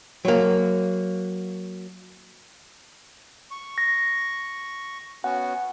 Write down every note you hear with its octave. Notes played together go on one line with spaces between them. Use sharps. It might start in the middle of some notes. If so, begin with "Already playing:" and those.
F#3 A#3
C#6
A#6
B3 C#4 F#4 F#5